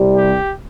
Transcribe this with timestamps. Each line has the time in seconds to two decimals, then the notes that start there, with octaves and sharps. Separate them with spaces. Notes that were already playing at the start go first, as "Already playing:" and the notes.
Already playing: C2 C3 G3
0.15 G4